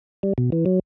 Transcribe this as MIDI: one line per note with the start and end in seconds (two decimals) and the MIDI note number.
0.23 0.33 55
0.38 0.50 47
0.52 0.65 52
0.66 0.80 54